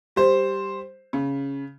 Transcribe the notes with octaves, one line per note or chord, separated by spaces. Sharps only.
G3 C5
C#3